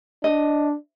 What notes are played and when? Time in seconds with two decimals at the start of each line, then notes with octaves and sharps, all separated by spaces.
0.24 D4 D#5